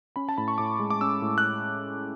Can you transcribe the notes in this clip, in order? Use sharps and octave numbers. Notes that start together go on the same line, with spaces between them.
C#4 B5
A5
A2 B5
C#6
A2 D6
G#3
D6
C#4 E6
A2
F#6